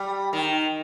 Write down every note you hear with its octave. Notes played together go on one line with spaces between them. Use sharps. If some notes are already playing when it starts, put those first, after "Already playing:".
Already playing: G3
D#3